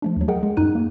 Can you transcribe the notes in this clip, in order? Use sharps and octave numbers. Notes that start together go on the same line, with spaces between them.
F3 A3 D4
D#2 F#3
G#4 A#4 D#5 F#5 G5
G#3
F#2 D#4 F#6 D#7
A#3